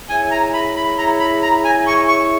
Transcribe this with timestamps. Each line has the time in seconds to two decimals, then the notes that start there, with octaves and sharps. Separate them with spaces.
0.09 E4 G#4 C#5 E5 G#5
0.31 A#5
0.53 B5
0.75 B5
0.98 E4 G#4 C#5 E5 A#5
1.19 B5
1.42 A#5
1.64 G#5
1.86 E4 G#4 C#5 E5 C#6
2.08 C#6